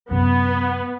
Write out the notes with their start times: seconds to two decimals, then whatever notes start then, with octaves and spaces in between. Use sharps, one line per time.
0.11 F#2 C3 B3